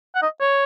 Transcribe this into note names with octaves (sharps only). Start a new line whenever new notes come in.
F#5
D#5
C#5